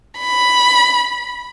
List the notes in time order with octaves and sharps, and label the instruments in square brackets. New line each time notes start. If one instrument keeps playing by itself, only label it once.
[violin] B5